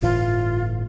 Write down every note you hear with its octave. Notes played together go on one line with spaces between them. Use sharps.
G1 A2 E3 F4